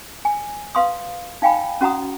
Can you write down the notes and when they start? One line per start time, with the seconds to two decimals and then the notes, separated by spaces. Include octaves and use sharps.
0.25 G#5
0.75 B4 F5 C6 D#6
1.42 D#4 F5 G5 G#5 B5
1.81 C#4 F#4 F#5 A#5 D#6